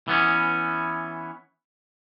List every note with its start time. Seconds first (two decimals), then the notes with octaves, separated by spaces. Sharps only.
0.08 E3 B3 C#4